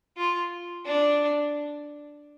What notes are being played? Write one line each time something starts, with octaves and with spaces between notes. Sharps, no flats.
F4
D4